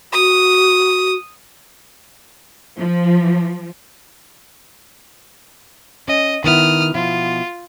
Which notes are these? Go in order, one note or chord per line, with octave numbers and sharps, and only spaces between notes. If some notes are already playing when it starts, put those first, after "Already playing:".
F#4 D#6
F3
C#4 D#5
D#3 B3 E4 D#6 F6
B2 F3 E4 F4